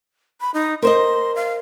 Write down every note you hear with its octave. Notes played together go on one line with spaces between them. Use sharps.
B5
D#4
A#4 C5 D#5 C6
F5